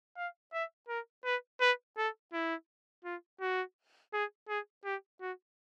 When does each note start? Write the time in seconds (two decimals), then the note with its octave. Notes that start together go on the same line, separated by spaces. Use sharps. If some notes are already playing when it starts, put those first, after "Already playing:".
0.17 F5
0.53 E5
0.89 A#4
1.25 B4
1.61 B4
1.98 A4
2.33 E4
3.05 F4
3.41 F#4
4.14 G#4
4.49 G#4
4.85 G4
5.21 F#4